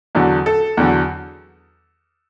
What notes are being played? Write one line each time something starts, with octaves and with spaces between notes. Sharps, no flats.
E2 D3 F#3
A4
E2 D3 F#3